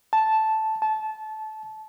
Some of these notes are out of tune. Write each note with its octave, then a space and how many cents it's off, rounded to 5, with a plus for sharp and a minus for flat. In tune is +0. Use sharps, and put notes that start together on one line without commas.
A5 -5
A5 -20